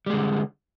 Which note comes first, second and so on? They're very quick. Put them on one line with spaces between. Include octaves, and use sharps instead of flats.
G3 G#3 D3